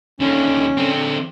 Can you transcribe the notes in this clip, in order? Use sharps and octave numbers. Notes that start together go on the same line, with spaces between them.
D#2 D3 C#4
D3 C4